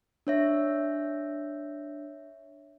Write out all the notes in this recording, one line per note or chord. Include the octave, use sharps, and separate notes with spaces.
D4 C#5 E5